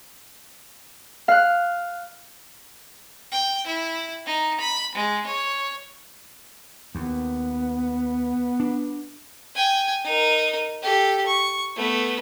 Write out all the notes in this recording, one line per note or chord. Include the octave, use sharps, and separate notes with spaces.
F5 F#6
G5
E4
D#4
B5
G#3
C#5
D#2 B3
D4
G5 G#5
D#4 A#4
G4 A4
C#6
A3 B3